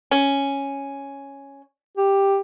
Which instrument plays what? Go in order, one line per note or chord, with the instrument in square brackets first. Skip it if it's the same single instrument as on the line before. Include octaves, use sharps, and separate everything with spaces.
[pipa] C#4
[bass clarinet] G4